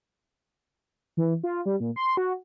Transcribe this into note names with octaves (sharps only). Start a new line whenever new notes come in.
E3
F4
G3
A#2
C6
F#4